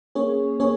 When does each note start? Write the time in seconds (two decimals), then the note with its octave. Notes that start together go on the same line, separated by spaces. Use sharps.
0.15 A#3 C#4 G#4 C#5
0.60 A#3 C#4 G#4 C#5